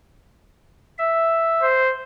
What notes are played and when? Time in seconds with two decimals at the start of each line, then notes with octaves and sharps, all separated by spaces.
0.98 E5
1.62 C5